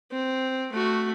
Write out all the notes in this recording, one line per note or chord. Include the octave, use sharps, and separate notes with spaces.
C4
A3 F#4